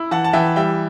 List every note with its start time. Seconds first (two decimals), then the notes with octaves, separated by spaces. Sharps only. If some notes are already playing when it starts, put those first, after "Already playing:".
Already playing: E4
0.11 E3 F#5 A5
0.24 A5
0.33 E3 E5 G5
0.56 G3 E5 G5